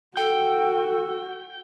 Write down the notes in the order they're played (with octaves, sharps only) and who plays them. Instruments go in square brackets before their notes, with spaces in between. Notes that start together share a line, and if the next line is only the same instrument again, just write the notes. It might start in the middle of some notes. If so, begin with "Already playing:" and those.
[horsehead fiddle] F#4 [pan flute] A4 [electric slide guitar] G5